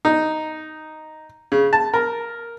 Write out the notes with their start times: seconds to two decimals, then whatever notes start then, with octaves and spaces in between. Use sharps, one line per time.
0.05 D#4
1.52 C#3
1.73 A5
1.94 A#4